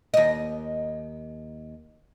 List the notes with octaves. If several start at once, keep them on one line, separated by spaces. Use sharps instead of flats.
D#2 D#5